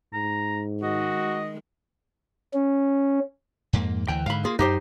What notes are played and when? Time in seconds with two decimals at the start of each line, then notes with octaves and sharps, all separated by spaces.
0.13 G#2 A#5
0.83 D#3 G#3 F#4 D#5
2.54 C#4
3.73 F2 G#2 A#3
4.08 D2 E3 G5
4.26 G#2 D3 F5 B5
4.45 A#3 F4 G#4
4.59 F#2 D#4 G4 C5